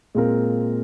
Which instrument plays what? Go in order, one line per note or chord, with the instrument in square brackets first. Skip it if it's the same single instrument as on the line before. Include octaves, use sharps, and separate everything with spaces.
[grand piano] A#2 G#3 C4 F4 A#4